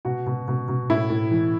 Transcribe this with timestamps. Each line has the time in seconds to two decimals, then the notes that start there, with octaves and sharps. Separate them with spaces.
0.05 B2 F#4
0.26 B2
0.48 B2
0.68 B2
0.90 A2 E4
1.10 A2
1.31 E3